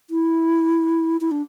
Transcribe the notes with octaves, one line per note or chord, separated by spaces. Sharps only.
E4
E4
D4